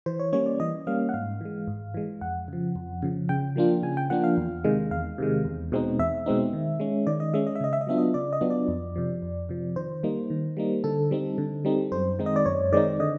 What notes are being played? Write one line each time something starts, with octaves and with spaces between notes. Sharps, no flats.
E3 C5
C#5
G3 A#3 C#4 C#5
D5
E3 D#5
G3 A#3 C#4 F5
F#5
G#2 F5
E3 G#3
G#2
E3 G#3
F2 F#5
C#3 F3
F2
C#3 F3
C#3 G5
F3 A#3 D4 F4
C#3 G#5
G5
F3 A#3 D4 F4 F#5
F5
E2
C3 D#3 G#3
E2 F5
C3 D#3 G#3
E2
B2 G#3 C4 D#4
E2 E5
B2 G#3 C4 D#4
D#3
G#3 C#4
D#3 D5
D#5
G#3 C#4 E5
D#5
E5
C#3 D#5
E5
D#5
F#3 B3 D4 F4 E5
D#5
C#3 D5
D#5
F#3 B3 D4 F4
D5
F2
C3 F3
F2
C3 F3
D#3 C5
G3 A#3 D#4
D#3
G3 A#3 D#4
D3 A4
G3 C4 D#4
D3
G3 C4 D#4
F#2 C5
D#3 G#3 C4 D#4
D#5
D5
F#2 C#5
D#3 G#3 C4 D#4 D5
D3 D#5